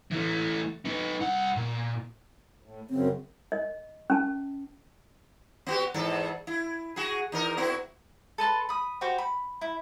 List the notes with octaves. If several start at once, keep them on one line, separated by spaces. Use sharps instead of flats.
E3 A3
D#4 B4
C2 F#5
A#2
A2
F#2 C#3 C4
D#5
C#4 A5
B3 F#4 G4
E2 G#2 A4
E4
F#4 G#4
E2 D#4 A#4
B3 E4 F#4
A4 B4 A5 C6
B5 D#6
F#4 G4 C5 G5
B5
E4